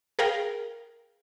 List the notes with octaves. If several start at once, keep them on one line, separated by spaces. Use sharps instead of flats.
G#4 A#4 F5 G5 A#5